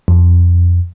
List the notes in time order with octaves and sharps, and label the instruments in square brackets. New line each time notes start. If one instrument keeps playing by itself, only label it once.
[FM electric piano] F2